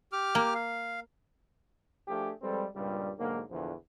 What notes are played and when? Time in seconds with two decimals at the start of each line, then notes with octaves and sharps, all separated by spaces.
0.12 G4 D6 F6
0.35 A#3
0.55 F5
2.08 F3 A3 D4 G4 G#4
2.42 F3 G3 G#3 C4 A4 B4
2.75 C#2 G2 A#2 G3
3.18 B1 G#2 D3 F#3 A#3
3.49 A#1 E2 D3 F3